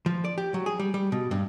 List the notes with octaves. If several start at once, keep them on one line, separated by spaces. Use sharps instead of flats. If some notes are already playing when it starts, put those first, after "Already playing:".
F3
D5
G4
F#3
G#4
G3
G3
B2
G2